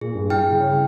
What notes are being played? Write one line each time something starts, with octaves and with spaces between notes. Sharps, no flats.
A#2 G#4
G2
E4 G5 F6
C#3